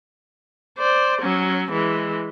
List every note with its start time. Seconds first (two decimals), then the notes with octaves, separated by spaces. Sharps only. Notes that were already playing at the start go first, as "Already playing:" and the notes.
0.78 C5 D5
1.21 F#3 C#4
1.71 E3 G#3